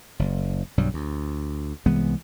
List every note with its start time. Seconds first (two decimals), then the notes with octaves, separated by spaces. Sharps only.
0.19 F#1
0.77 B1 G2 F#3 G3
0.94 D2
1.86 C2 E3 G#3 B3